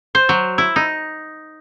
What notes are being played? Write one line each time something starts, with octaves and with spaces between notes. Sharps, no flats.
C5
F#3
E4
D#4